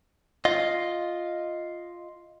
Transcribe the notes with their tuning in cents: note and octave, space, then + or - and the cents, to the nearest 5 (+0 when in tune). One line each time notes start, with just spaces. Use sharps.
F4 +0 D#5 +5